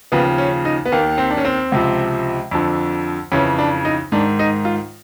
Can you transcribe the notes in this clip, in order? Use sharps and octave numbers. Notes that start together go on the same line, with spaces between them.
D#2 C#3 F3 B3
C#4
D#4
B3
D#2 D#3 A#3
C4
D4
C#4
C4
C#2 C3 F3
F2 D3 F3
F2 C#3 E3 C#4
D4
D#4
G#2 D#3 D4
D#4
F4